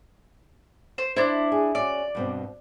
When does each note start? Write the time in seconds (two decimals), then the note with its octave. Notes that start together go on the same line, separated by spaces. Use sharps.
0.98 C5
1.16 D4 E4 C5
1.52 G#4
1.75 C#4 F#4 D5
2.15 G2 B2 C4